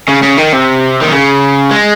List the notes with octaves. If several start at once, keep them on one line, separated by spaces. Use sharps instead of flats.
C#3
C#3
D#3
C3
D#3
C#3
G#3